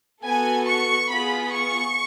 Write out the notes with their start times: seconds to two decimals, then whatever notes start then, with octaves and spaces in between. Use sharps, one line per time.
0.24 B3 F#4 A4 G#5
0.67 C#6
1.09 B3 F4 G#4 B5
1.52 C#6